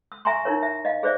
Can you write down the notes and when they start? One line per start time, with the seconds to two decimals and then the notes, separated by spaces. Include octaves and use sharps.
0.12 E6
0.25 E5 G#5 A#5 C6 C#6
0.45 D#4 E4 A#4 C#5
0.63 E5
0.85 D#5 F5
1.03 G#4 C5 D5 E5